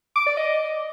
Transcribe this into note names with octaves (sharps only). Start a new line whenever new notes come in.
D6
D5
D#5